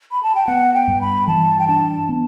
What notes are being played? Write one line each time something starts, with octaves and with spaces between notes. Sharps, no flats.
B5
A5
G5
B3 F#5
G5
G2
B5
E3 A5
G5
D4 A5
B3